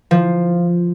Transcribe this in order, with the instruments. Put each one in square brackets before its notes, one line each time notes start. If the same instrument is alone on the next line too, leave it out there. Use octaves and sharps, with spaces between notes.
[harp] F3